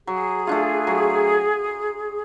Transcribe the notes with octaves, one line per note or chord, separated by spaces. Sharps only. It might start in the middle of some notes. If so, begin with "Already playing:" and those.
F#3 G#4
A3 D4 F4
F#3